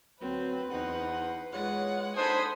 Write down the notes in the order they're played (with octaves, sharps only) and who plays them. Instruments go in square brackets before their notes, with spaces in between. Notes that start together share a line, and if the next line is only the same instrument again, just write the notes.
[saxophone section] D2 F#3 [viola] C4 [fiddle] B4
[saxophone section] E2 C5 F#5 [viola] D#4
[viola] G#3 F#5 [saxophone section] F4 C#5
[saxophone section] D4 D#4 [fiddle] A4 D#6 [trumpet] C5 [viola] G#5 B5